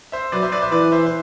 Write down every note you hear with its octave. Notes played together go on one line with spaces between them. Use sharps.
C5 E5
F#3 B4 D5
C5 E5
B4 D5
C5 E5
E3 B4 D5
C5 E5
C5